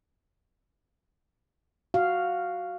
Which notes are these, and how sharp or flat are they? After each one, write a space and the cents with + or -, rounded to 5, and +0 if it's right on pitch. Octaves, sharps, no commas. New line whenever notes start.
F#4 +0 F5 +0